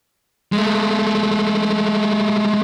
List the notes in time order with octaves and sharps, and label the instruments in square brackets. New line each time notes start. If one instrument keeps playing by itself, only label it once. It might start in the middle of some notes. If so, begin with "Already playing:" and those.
[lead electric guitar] G#3 A3